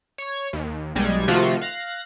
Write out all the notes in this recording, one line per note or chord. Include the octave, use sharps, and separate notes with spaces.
C#5 C#6
D#2
B1 G3 G#3 G#6
C3 D#3 F3 A3 F4 F#4
F5 F#6 A#6